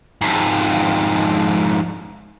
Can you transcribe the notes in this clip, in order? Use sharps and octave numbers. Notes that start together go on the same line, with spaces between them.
F2 G#2